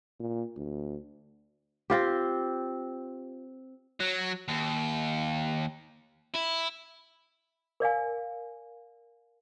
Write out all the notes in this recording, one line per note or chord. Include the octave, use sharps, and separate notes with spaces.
A#2
D2
C4 F4 G4
F#3
D#2
E4
A#4 D5 F5 G#5